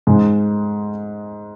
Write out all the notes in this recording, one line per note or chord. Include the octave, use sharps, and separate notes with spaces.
G#2 G#3